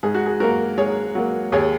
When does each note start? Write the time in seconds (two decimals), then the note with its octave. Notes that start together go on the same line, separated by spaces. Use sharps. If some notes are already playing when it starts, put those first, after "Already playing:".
0.03 G#2 G#4
0.15 F#4
0.26 G#4
0.40 F#3 A#3 F#4 A#4
0.78 G#2 G#4 C#5
1.15 F#3 A#3
1.52 D#2 G#4 C#5